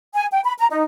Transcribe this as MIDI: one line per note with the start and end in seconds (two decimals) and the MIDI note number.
0.14 0.26 80
0.31 0.40 79
0.44 0.53 83
0.57 0.66 82
0.70 0.83 63